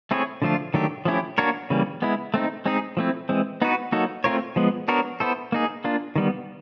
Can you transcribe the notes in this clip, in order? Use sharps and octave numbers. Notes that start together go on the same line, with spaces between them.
A3 C4 E4 G#4 C#5
D3 F3 A3 D4 F4
D#3 F#3 A3 D4 G4
F3 A3 C#4 E4 G4
A#3 D4 F#4 A#4 C#5
C#3 E3 G3 A#3
G#3 B3 E4
A3 C4 D#4
G#3 C4 D#4 G#4
F3 A3 C4 E4
E3 G#3 C4
B3 D#4 F#4 B4
F#3 A#3 D#4 F#4 A4
A3 C4 F4 A#4 C#5
F3 G#3 B3
B3 D4 F#4 A#4 C#5
B3 E4 A4 C5
A#3 D#4 G#4
A#3 D4 F4
D#3 G3 B3